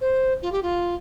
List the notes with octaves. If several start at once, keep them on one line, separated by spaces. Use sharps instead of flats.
C5
F4
G4
F4